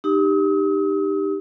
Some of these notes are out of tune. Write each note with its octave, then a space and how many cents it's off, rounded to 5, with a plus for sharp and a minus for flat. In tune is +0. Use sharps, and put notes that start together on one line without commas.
D#4 -30 G4 +0 D#6 +45